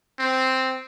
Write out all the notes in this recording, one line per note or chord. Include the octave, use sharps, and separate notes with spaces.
C4